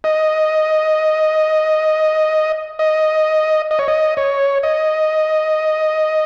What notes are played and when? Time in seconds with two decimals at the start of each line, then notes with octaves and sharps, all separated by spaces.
0.04 D#5
2.79 D#5
3.71 D#5
3.79 C#5
3.88 D#5
4.17 C#5
4.63 D#5